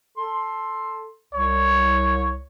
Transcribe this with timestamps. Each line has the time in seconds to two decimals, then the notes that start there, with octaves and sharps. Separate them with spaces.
0.18 A4 C6
1.34 C2 C#5